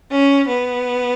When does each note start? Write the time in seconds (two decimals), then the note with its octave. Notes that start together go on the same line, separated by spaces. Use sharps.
0.11 C#4
0.48 B3